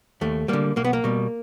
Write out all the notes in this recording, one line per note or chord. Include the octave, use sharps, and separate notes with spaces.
D#2 A3
D3 G3 A#3
B1 A#3
B3
A#3
B2 G3